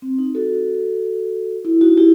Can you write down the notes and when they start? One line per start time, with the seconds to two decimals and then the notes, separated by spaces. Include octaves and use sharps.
0.02 C4
0.19 D#4
0.35 F#4 A4
1.65 E4
1.81 D#4 F#4
1.97 E4 G4